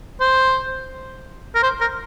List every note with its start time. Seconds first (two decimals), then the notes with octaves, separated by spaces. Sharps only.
0.21 C5
1.55 A#4
1.63 C5
1.81 A#4